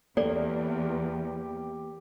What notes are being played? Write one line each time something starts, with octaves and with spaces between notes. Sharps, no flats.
E2 A#3 G4 A4 D5